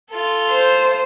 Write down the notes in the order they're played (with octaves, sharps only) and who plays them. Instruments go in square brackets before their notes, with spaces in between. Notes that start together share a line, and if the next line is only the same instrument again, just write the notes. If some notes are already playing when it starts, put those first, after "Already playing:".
[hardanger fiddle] F4 A4
[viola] C5